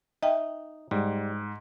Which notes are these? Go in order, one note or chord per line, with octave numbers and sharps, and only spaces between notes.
D#4 D#5 E5 G5
G#2 G3